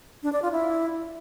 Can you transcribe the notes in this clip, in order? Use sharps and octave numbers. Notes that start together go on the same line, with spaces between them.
D4
D5
F4
E4